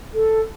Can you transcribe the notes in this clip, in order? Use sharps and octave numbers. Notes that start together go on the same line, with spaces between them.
A4